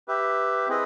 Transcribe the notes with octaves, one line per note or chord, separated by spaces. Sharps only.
G4 B4 E5
C4 E4 G#4 B4 D#5